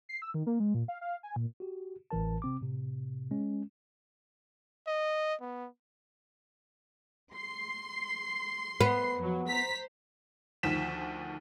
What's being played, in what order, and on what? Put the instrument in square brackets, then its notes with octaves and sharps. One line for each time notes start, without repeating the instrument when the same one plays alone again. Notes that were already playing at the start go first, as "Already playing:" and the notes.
[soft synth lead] C7
E6
D#3
A#3
G#3
A#2
F5
F5
G#5
A#2
[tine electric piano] F#4 G4
A1 A2 E3 A#4 A5
C3 C4 D6
A2 C3
G#3 C#4
[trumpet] D#5
B3
[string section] C6 C7
[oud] B3
[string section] F2 F#3
C5 A#5 B6
[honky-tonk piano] D2 D#3 F3 B6 E7